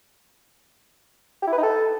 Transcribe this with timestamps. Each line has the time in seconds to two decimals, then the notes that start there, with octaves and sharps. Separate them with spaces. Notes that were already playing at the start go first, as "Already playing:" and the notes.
1.42 G4
1.48 E4
1.53 B4
1.58 D#4
1.63 A4